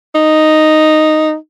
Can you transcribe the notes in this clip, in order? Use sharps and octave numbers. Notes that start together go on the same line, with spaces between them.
D#4